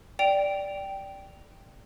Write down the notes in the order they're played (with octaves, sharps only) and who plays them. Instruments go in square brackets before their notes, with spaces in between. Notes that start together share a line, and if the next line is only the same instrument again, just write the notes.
[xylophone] D5 G5 D7 F7